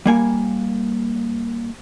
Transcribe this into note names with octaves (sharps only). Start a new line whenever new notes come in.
G3 A#3 G#5